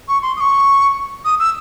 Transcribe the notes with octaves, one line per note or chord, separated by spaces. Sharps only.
C#6
C6
D#6
C#6
D#6
E6